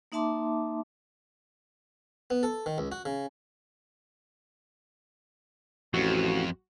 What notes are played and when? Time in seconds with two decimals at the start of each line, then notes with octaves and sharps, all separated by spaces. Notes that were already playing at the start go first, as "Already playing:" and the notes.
0.12 A#3 D#4 E5 A5 C6 D6
2.30 B3
2.43 A4
2.66 D#3
2.78 C#2
2.92 F#4
3.05 C#3
5.94 A1 F2 F#4